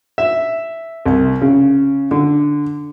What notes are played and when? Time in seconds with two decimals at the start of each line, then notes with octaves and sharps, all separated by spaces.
0.18 E5
1.06 C2
1.41 C#3
2.11 D3